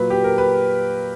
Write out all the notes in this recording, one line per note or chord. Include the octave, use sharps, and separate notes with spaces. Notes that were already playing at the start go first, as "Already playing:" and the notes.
Already playing: A#2 F#3 B4
G4
A#4
B4